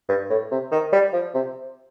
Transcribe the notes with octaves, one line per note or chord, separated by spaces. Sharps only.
G2
A2
C3
D#3
G3
F3
C3